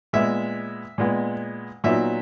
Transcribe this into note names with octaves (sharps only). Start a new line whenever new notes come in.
A#2 G#3 B3 E5
A#2 G#3 B3
A#2 F#3 B3 D#4 E5